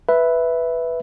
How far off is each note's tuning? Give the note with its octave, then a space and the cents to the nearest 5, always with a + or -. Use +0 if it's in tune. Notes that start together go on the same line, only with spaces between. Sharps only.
B4 +0 E5 +0